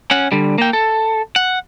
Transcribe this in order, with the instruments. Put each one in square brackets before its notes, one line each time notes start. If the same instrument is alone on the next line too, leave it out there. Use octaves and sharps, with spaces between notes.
[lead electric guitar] C#4 F#5
D3 G3
A#3 G5
A4
F#5